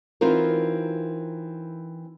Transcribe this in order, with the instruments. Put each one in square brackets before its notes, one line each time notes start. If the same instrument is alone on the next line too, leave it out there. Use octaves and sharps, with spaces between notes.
[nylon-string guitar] E3 C4 D#4 F4 F#4 A#4